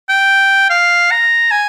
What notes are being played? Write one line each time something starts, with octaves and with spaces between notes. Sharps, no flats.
G5
F5
A#5
G#5